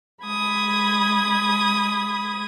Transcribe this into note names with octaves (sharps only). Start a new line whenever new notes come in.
G#3 B5 D#6 G#6